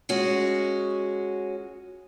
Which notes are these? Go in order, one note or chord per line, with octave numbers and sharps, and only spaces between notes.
G#3 C#4 F#4